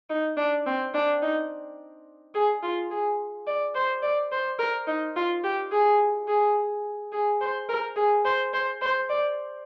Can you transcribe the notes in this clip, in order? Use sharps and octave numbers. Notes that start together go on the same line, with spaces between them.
D#4
D4
C4
D4
D#4
G#4
F4
G#4
D5
C5
D5
C5
A#4
D#4
F4
G4
G#4
G#4
G#4
C5
A#4
G#4
C5
C5
C5
D5